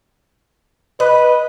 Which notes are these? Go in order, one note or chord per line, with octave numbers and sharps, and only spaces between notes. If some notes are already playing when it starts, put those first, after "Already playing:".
B4 D#5